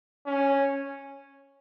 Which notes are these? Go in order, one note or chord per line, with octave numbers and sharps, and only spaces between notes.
C#4